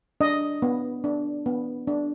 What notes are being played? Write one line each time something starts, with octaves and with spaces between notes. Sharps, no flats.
D4 D#5
B3
D4
B3
D4